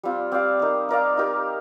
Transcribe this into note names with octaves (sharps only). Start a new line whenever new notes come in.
G3 C4 F4
C4 G4 D5 F5
C4 D#4 A#4
D#4 A#4 D5 F5
D#4 G4 A#4